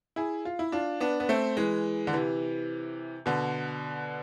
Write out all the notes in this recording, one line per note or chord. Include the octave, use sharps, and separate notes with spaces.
E4 G#4
F4
E4
D4 F4
B3 D4
B3
A3 C4
E3 G#3
D3
C3 E3
B2 D3